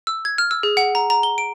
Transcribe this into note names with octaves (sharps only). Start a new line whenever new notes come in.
E6
G#6
F6
E6
G#4
F#5
A#5
A#5
G7
D7